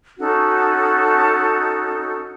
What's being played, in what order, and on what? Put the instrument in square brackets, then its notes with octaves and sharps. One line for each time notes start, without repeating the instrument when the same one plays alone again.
[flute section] C#4 D#4 F#4 A4